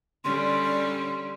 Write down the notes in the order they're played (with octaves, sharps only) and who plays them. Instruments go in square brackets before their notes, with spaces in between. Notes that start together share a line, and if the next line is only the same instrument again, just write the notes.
[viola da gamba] D3 G3 C#4 [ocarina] C6